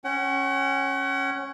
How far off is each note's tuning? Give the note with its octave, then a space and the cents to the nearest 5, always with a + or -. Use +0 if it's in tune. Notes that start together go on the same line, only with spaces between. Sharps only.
C#4 -10 F#5 +40